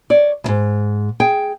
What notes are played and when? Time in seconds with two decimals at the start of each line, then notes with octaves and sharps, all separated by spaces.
0.10 C#5 D5
0.44 D2 G#2
1.20 G#4 G5